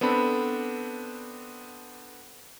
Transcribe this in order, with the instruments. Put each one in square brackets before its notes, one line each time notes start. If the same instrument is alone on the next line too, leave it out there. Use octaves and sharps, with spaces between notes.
[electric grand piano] B3 C4 D4 A4 B5